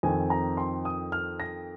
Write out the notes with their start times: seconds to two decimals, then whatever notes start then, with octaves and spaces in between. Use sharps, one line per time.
0.03 F2 D#3 C4 G#5
0.30 A#5
0.57 C6
0.85 D#6
1.12 F6
1.40 A#6